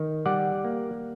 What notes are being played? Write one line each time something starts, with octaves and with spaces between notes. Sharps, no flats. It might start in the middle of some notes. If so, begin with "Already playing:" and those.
Already playing: D#3
G3 D5 F#5
A#3